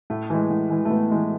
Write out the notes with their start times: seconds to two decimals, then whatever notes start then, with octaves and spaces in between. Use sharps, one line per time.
0.10 A2 A3
0.30 E3 G#3
0.51 A2
0.71 E3 G#3
0.85 A3
0.90 A2 B3
1.11 E3 G#3